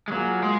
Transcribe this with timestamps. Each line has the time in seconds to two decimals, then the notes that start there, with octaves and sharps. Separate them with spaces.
0.08 G#3
0.12 F#3 A#3 F4 G#4
0.43 G#3